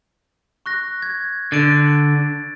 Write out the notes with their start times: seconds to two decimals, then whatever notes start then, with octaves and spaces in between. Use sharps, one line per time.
0.66 C#6 F#6 A#6
1.02 G#6
1.52 D3 A6 D7